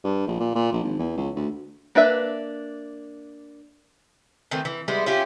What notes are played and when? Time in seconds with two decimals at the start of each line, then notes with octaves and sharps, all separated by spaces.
0.04 G2
0.27 A#1
0.40 A#2
0.55 A#2
0.72 A#1
0.83 G#1
0.99 E2
1.17 C#2
1.36 D2
1.95 A#3 D4 B4 E5
4.51 D#3 E3 A3 C4
4.65 E3
4.88 G3 G#3 B3 E4
5.06 C#4 E4 F4 G4